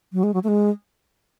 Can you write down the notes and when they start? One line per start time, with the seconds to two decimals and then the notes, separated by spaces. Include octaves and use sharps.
0.13 F#3
0.23 G#3
0.34 F#3
0.44 A3
0.48 G#3